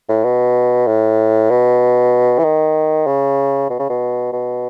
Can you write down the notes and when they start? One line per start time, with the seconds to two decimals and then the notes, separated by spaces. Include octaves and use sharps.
0.09 A2
0.24 B2
0.87 A2
1.50 B2
2.38 E3
2.44 D#3
3.07 C#3
3.70 B2
3.79 C#3
3.90 B2
4.33 B2